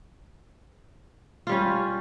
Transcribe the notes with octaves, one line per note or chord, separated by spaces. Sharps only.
G3 C#4 F4